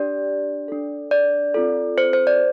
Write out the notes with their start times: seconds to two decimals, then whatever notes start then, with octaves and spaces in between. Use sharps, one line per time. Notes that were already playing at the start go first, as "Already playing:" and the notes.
Already playing: D4 G4 D5
0.68 D4 A4
1.11 D5
1.54 C4 F4 A4
1.98 C5
2.13 C5
2.27 D5